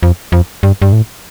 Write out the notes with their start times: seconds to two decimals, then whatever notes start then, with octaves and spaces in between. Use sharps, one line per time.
0.03 F2
0.32 F2
0.63 G2
0.82 G2
0.93 A2